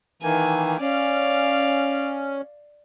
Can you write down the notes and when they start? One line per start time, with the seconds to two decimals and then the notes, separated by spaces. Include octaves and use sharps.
0.22 D#3 E3 A#3 G#5
0.80 C#4 D5 F5